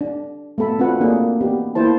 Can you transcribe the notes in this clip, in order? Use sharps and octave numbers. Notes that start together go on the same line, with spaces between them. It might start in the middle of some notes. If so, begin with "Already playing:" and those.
D4
A3 B3 A4 B5
C4 D4 F4 F#4 B4 F#5
A3 A#3 D4 G#4
B3 D4 G4
A#3 B3 E4 C5 A5